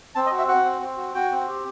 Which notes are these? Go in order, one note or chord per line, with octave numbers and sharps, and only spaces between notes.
C4 A5
D#5
F#4
E5
F#4 F#5
C4
C4
F#4
F#4 G5
C4
G4